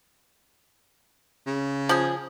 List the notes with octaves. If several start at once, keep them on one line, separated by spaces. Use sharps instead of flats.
C#3
F3 G#4